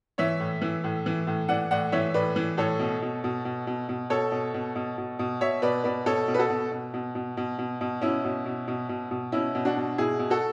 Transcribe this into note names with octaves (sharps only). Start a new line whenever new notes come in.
E3 C#5 E5
A2
E3
A2
E3
A2
E3 D5 F#5
A2 D5 F#5
E3 C#5 E5
A2 B4 D5
E3
A2 A4 C#5
B2
B2
B2
B2
B2
B2
B2 A4 C#5
B2
B2
B2
B2
B2
B2 C#5 E5
B2 B4 D5
B2 B4 D5
B2 A4 C#5
B2
B4
F#4 A4
B2
B2
B2
B2
B2
B2
B2
B2 C#4 E4
B2
B2
B2
B2
B2
B2 C#4 E4
B2
D4 F#4
B2
B2 E4 G#4
B2
F#4 A4